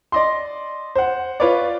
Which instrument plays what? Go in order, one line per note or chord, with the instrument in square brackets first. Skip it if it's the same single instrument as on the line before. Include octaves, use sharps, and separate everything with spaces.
[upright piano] D5 D#5 C6
C5 F#5
F4 B4 C#5 D5